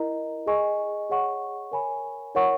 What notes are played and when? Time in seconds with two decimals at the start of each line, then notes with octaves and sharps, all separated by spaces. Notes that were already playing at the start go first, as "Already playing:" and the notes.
Already playing: E4 A#4 D#5 A#5
0.46 G#4 D#5 G#5 C#6
1.10 G#4 C#5 F#5 C#6
1.72 A#4 C#5 G#5 B5
2.35 E4 A#4 C#5 F#5 C#6